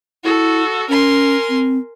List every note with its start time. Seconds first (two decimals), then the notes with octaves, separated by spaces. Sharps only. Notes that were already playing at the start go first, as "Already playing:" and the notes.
0.24 E4 F#4 A4
0.89 C#4 A#4 G#5 C6
1.49 C4